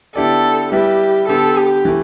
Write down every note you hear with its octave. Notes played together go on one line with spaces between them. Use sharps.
D3 B3 E4 G4 A4 D5
G3 E4 G4 B4 E5
D3 B3 G4 A4
G4
E3 A3